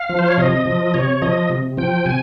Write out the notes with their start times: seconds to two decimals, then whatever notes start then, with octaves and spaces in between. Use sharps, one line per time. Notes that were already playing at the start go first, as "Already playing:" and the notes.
Already playing: F5
0.09 F3
0.19 C5
0.28 C#5
0.38 C3 D#5
0.66 F3
0.94 C3 C#5
1.22 F3 D#5
1.50 C3
1.77 F3 G5
2.06 C3 G#5